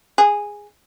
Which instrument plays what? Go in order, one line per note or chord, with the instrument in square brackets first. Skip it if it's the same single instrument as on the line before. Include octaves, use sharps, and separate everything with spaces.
[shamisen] G#4